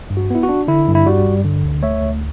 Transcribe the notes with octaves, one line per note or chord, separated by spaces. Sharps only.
G2
F#4
B3 E4
F#4
D4
D3 E4
G2
E4
G3 F#4
G2
D3
D2
A3 C#5 E5
D2